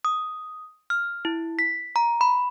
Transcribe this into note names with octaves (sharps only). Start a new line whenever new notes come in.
D#6
F6
E4
B6
A#5
B5